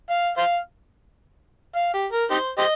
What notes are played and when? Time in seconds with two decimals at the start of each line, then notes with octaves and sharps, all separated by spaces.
0.10 F5
0.37 C5 F5
1.76 F5
1.94 G4
2.12 A#4
2.30 D#4 G4 C5
2.58 G4 C5 D#5